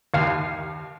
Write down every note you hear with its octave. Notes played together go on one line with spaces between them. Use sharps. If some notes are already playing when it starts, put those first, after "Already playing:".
D#2 F5